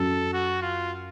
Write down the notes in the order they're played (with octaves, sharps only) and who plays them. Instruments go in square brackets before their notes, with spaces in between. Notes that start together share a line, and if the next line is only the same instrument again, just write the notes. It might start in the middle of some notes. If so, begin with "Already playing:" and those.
Already playing: [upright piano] F#2 F#3 [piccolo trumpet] A4
[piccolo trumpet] F#4
F4